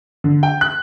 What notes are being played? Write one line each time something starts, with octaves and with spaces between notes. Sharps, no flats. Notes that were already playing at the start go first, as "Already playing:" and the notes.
D3
G5
F#6